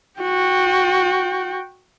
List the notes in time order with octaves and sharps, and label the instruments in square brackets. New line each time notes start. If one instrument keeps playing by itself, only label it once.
[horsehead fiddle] F#4 G5